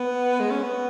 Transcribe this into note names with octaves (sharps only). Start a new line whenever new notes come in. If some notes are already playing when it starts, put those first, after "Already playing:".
Already playing: B3
G#3
C#4
B3